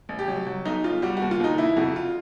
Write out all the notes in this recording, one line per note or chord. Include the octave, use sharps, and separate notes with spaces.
A1
G4
F#3
F#3
B1 D#4
B1 F4
G3 F#4
D#2 F#4
F4
D#2 D#4
E3 E4
F2 F#4
F4